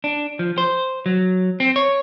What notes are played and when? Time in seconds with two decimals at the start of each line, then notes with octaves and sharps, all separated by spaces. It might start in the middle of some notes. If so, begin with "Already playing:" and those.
0.04 D4
0.39 F3
0.58 C5
1.06 F#3
1.60 C4
1.76 C#5